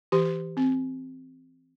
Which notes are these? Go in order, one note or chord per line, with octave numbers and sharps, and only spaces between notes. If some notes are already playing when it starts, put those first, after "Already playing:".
E3 G4
C4